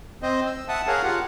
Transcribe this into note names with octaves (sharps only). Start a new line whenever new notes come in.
C4 C5 D#5
E6
E5 F#5 A5 D#6
G#4 A#4 C#5 F5 F#5
F4 G4 F#5